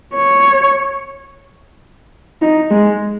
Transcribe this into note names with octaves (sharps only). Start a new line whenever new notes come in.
C#5
D#4
G#3